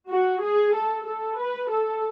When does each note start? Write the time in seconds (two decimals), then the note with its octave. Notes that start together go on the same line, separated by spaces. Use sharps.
0.10 F#4
0.42 G#4
0.74 A4
1.06 A4
1.38 B4
1.70 A4